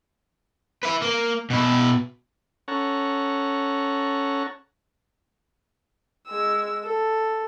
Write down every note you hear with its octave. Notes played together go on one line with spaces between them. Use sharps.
B4 E5
A#3
B2 E4
C#4 A4 C#5 F#5 A#5
G#3 E6
A4